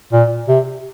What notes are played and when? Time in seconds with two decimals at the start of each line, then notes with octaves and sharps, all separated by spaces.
0.13 A#2
0.48 C3